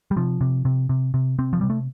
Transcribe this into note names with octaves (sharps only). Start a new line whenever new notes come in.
G3
C3 F3
C3
C3
C3
C3
C3 C4
F3
C3 G3
A3